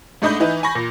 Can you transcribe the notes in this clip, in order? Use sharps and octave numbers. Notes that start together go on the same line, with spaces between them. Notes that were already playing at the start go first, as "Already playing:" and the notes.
G#2 A3 D4 D#5 B5 G6
E3 D#4 E4 B4
G#5 B5 C#6 A#6
A#2